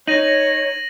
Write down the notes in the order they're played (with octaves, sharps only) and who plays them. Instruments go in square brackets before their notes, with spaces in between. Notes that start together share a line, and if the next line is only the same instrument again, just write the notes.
[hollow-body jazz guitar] D#4 [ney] C#5 [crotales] A#6 D#7 F#7